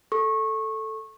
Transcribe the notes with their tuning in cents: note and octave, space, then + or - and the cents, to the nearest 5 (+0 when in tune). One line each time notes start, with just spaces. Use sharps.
A4 +0 C#6 -20